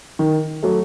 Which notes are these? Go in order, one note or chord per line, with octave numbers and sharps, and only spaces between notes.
D#3
F#3 A3